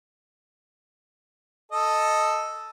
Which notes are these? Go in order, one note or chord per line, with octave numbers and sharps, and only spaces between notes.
A4 D#5